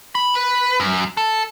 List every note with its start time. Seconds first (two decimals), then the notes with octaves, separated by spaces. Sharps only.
0.15 B5
0.35 B4
0.80 F#2
1.17 A4